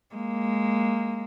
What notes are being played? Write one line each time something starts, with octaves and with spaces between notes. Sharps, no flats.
G#3 A#3